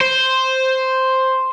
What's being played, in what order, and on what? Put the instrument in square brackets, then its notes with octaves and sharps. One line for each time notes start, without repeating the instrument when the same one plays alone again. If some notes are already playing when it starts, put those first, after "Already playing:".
[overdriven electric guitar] C5